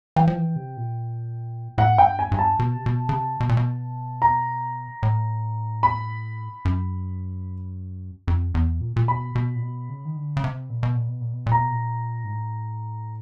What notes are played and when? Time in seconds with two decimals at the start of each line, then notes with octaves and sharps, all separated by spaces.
0.16 E3 G5
0.28 F3
0.37 E3
0.56 C3
0.77 A#2
1.78 A2 F#5
1.98 F#2 G5
2.06 G2
2.19 G#5
2.32 G2 G#5
2.39 A5
2.59 B2
2.77 C3
2.86 B2
3.09 C#3
3.13 C3
3.40 B2
3.49 A#2
3.57 B2
4.22 A#5
5.03 A2
5.83 B5
6.65 F#2
8.28 F2
8.55 E2
8.81 A#2
8.96 A#2
9.08 B2 B5
9.35 B2
9.55 A#2
9.62 B2
9.89 C#3
10.05 D#3
10.16 D3
10.37 C#3
10.44 C3
10.70 A#2
10.83 B2
10.95 A#2
11.08 B2
11.21 A#2
11.33 B2
11.46 A#2
11.52 A#5
11.59 B2
11.72 A#2
12.24 G#2
12.33 A2